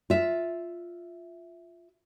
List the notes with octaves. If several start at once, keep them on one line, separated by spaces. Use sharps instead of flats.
F4 E5